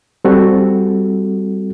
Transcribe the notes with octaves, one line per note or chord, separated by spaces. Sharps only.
G3 C4 F#4 A4